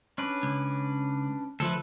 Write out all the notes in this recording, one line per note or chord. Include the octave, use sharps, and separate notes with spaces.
C#4 D4 B4
C#2
D2 F3 A3 A4 B4